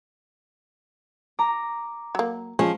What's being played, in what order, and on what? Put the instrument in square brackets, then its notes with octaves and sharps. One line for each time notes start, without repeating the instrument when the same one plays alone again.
[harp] A#5 [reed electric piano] D6
[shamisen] F#3 A#3
[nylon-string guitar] F3 [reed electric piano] G#3 [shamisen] C#4